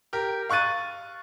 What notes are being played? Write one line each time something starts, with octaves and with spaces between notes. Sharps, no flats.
G4 A#4
F5 C#6 F#6 A6 D#7